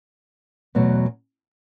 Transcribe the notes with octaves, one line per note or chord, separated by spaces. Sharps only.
E2 B2 F#3 A3